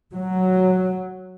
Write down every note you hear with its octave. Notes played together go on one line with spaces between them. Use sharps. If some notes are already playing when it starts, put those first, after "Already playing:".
F#3